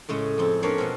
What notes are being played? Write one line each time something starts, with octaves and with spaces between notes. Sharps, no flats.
A2 C#3 G#3
F2 C4
A#3 C#4 D4 A#4 C#5 F5
B2 C4